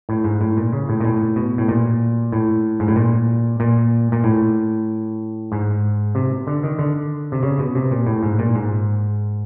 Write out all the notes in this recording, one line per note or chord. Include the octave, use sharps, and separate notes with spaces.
A2
G#2
A2
A#2
C#3
A2
A#2
A2
B2
A2
A#2
A2
G#2
A2
A#2
A#2
A#2
A2
G#2
C3
D3
D#3
D3
C3
C#3
B2
C3
A#2
A2
G#2
A#2
G#2